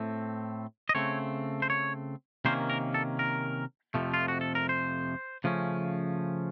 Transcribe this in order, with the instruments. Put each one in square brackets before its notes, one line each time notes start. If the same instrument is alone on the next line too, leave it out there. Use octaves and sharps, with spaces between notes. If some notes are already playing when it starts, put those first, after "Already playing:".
Already playing: [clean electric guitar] A2 A3 C4
D#5
C#3 A3 C4 C#5
C5
C#5
C3 D#3 A#3 C#4 C5
A#4
A4
A#4
F2 C3 F3 A3
F4
F#4
A4
A#4
C5
C#3 F3 A3 C#4